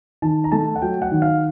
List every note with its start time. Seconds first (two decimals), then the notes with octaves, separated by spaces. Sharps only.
0.22 D#3 A5
0.44 A#5
0.52 A3 A5
0.76 F#5
0.82 F#3 G5
1.02 F#5
1.11 D#3
1.22 F5